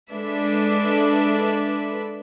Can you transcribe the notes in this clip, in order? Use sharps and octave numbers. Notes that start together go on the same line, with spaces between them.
G#3 D4 A4 B4 E5